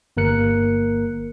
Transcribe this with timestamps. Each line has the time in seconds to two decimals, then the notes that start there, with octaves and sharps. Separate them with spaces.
0.17 G1 A#3 A#4 F#6 C#7